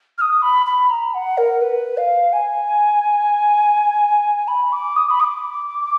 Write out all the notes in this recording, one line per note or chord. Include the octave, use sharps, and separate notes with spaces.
F6
D#6
B5
B5
A#5
F#5
A#4
B4
F5
G#5
B5
D6
D#6
B5
D#6
D6